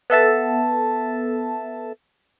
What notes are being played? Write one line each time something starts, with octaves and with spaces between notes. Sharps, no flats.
B3 A4 E5 A5